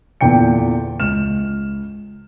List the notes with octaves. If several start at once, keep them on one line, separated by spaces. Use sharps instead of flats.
E2 A#2 D3 G5 C#7
C#2 F6 E7